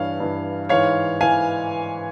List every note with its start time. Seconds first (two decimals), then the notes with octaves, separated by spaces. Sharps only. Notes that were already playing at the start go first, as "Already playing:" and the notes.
Already playing: G2 E3 C#5 F5
0.20 G2 E3
0.69 G#2 E3 C#5 F5
1.21 E3 F5 G#5